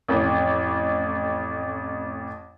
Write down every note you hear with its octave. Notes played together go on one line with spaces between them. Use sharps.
A1 F2